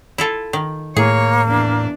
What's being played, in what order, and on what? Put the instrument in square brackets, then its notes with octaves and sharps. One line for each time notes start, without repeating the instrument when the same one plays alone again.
[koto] E4 F4 A4
D#3
[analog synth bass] A2 [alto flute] A#3 [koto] G#4 [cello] C#5
[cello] E2 D4